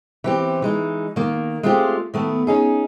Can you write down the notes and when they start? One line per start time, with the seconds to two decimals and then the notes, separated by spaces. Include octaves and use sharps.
0.24 E3 C4 G4
0.62 E3 G#3 D#4
1.16 D#3 A#3
1.63 G#3 A3 C4 E4 F4 G4
2.14 D#3 A3 B3
2.47 C#4 D#4 G#4